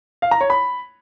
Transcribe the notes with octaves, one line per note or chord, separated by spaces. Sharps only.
F5
A#5
C#5
B5